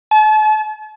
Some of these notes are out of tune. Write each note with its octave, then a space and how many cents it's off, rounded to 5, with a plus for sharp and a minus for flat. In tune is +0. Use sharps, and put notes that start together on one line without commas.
A5 -40